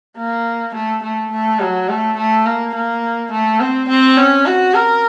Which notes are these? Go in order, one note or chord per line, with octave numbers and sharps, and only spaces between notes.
A#3
A3
A3
A3
F#3
A3
A3
A#3
A#3
A3
C4
C4
C#4
F#4
A#4